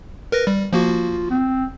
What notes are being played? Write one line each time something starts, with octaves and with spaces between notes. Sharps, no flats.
A#4 B4 A#6
G3
F3 A#3 F4 F#4
C4